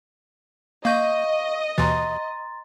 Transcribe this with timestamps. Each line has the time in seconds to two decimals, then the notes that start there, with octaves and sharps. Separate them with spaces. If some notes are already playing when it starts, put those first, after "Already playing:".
0.85 A#3 D#5 F5 C#6 G6 D#7
1.78 D#2 B2 E3 A#5 C6 A6